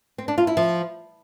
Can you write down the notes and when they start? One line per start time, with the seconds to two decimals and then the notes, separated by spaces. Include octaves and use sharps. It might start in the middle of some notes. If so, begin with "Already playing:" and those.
0.18 C4
0.28 D4
0.38 F4
0.47 E4
0.57 F3